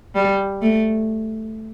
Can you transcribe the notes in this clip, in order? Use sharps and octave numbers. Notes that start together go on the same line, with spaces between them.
G3
A3